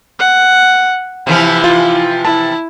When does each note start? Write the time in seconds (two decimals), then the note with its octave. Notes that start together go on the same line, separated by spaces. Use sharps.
0.19 F#5
1.27 C3 E3 F3 E4
1.64 F4
2.25 E4 A5